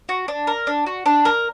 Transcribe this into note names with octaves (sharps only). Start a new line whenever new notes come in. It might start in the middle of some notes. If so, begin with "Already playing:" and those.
F#4
D4
A#4
D4
F#4
D4
A#4